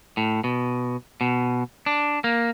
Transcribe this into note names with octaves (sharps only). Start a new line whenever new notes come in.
A2
B2
B2
D4
A#3